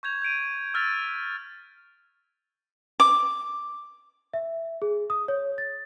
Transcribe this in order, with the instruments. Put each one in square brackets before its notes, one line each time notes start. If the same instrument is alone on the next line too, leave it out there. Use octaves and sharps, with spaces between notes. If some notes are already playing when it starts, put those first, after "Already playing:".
[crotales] C#6 G6 G#6 F7
G6 G#6 D7 D#7
E6 F6 A6 B6 F7
[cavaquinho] D6
[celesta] E5
G#4
D#6
C#5
A6